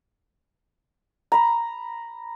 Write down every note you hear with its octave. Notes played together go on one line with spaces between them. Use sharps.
A#5 B5